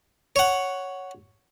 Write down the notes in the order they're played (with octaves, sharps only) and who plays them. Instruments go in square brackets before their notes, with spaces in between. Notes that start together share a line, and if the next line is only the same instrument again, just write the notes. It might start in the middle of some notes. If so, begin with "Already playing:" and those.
[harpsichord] C#5 F#5